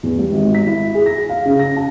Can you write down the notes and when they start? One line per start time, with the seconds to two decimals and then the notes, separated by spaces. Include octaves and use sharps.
0.03 E2
0.19 G3
0.32 G#1
0.55 B6
0.67 E4
0.94 G#4
1.06 A#6
1.29 F5
1.46 C#3
1.59 A#6
1.76 A5